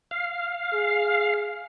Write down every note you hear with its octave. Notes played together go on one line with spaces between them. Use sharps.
F5
G#4